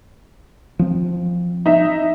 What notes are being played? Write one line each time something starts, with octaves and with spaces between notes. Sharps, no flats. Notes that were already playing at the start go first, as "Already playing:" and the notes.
F3 C4
D#4 E5